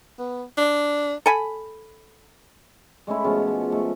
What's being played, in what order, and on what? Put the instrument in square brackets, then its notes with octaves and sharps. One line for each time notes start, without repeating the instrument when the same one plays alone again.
[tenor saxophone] B3
D4
[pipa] A4 G#5 B5
[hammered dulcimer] G#3 A3 C#4 E4
B2 F3 G#3 C#4
G#3
A3